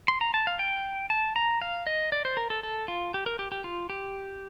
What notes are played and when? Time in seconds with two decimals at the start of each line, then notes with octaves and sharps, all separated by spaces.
0.08 C6
0.21 A#5
0.34 A5
0.47 F5
0.59 G5
1.10 A5
1.36 A#5
1.62 F5
1.87 D#5
2.12 D5
2.25 C5
2.37 A#4
2.50 A4
2.63 A4
2.88 F4
3.14 G4
3.26 A#4
3.39 G4
3.52 G4
3.64 F4
3.90 G4